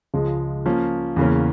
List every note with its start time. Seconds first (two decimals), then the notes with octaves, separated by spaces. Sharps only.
0.14 C#2 C#3 F3 G#3
0.66 F3 A#3 C#4
1.16 E2 C#3 E3 A#3 C#4